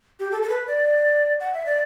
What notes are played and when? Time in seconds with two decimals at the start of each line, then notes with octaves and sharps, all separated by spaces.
0.20 G4
0.31 A4
0.43 A4
0.49 B4
0.67 D5
1.40 F#5
1.54 E5
1.66 D5